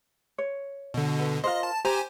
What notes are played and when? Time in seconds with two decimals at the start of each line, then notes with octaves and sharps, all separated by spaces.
0.38 C#5
0.94 B2 D3
1.19 B4
1.44 F4 A#4 C5 D#5
1.63 A5
1.85 G4 C5 G#5 A#5